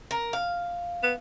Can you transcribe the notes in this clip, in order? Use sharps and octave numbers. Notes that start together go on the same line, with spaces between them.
A#4
F5
B3